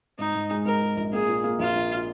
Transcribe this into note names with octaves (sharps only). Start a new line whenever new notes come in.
G#2 D#4
G#2
G#3
G#2 A#4
G#3
A#1
A#3 G#4
A#2
A#3
A#1 F4
A#1